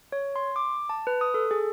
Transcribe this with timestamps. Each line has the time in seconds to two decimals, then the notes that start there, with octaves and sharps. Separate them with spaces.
0.12 C#5
0.36 C6
0.56 D6
0.89 A5
1.07 B4
1.21 D#6
1.34 A4
1.51 G#4